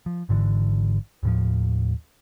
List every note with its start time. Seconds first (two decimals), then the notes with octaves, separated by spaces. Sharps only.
0.06 F3
0.29 G#1 G#2 D3 E3
1.23 D#2 A2 F3